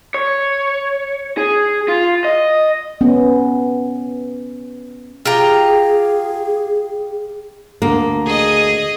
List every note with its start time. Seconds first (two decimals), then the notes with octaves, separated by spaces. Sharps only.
0.14 C#5
1.38 G#4
1.88 F4
2.25 D#5
3.01 B3 C#4
5.26 F4 G4 G#4 A#5
7.82 D2 A#3
8.26 G#4 D#5